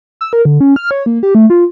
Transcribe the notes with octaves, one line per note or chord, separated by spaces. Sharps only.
E6
A#4
D3
C#4
F6
C#5
A#3
G4
A3
F4